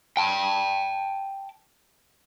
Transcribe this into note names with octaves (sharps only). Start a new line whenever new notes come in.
G5 A5